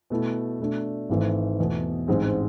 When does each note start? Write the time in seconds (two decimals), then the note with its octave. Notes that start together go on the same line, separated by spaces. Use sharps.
0.10 B2 A3 E4
0.59 B2 A3 D4
1.09 G#1 G#2 E3 A3
1.59 E2 B2 A3
2.08 A1 G#2 G#3 C4